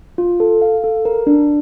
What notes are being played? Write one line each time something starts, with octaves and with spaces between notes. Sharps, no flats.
F4
A4
F5
A4
A#4
D4